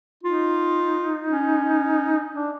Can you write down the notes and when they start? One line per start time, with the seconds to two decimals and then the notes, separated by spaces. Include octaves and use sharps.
0.23 D#4 F4
1.29 C#4
2.35 D4